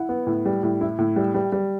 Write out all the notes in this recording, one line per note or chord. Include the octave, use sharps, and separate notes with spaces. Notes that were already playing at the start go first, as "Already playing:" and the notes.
Already playing: E4 F#5
B3
A2
G3
A2
E4
A2
G3
G3
G3